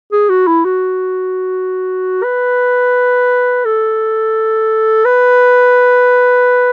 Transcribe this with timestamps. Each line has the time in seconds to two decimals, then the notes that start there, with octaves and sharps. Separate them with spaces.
0.12 G#4
0.30 F#4
0.47 E4
0.65 F#4
2.24 B4
3.65 A4
5.05 B4